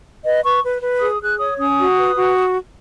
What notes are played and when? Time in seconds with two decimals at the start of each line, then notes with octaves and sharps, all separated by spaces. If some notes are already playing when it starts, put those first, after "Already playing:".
0.24 B4 D#5
0.43 B4 C#6
0.63 B4
0.82 B4
1.01 G#4 D#6
1.20 G#4 F#6
1.39 C#5 D#6
1.58 C#4 D#6
1.78 F#4
1.97 B4
2.16 F#4